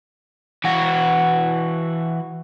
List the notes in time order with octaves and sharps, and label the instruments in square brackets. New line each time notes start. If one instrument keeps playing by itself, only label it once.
[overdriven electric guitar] E3 F#4